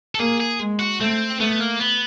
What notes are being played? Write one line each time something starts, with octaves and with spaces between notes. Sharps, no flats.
A4
A#3 G#4
G#4
G#3
F#4
A3 C4
A3 B3
A#3
B3